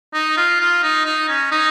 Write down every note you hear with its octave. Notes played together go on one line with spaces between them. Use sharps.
D#4
F4
F4
D#4
D#4
C#4
D#4